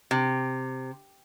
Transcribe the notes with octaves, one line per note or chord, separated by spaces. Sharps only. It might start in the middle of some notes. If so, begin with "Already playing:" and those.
C3